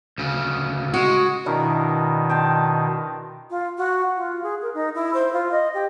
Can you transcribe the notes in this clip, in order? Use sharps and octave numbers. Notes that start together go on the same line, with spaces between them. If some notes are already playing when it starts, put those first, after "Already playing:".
D2 C#3
G#3 F#4
B2 D#3 D4 E4 A#4
G5 A5 C6
F4
F#4
F4
G#4
A#4
D#4
E4
C5
F4
D#5
G4